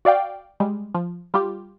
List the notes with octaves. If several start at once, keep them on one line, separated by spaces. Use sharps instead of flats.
F#4 D5 F5 G5
G3 G#3
F3
G3 F4 G4